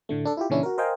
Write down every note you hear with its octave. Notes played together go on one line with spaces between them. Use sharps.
A2 D3 A3
D4 A4
E4 F4 G4
A#2 C#3 E3 C#4 D4 E4
F#4 A#4
A#4 C5 D#5 F5 G5 G#5